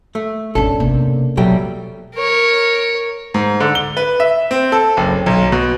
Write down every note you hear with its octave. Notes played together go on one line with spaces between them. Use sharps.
A3
G#1 E2 B2 C#4 D4 A4
C3 A#3
B2 F#3 G3 A4 E5 G5
A#4 C#5
G#2
D3
G7
B4
E5
C4
A4
F#1
B1
B2